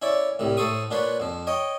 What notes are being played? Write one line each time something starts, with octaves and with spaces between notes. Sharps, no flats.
C#4 E4 C#5 D5
C2 A2 G3
A2 A4 C5 C#6 D#6
A#2 D4 F4 B4 C#5
F2 F3
C#5 D#5 G5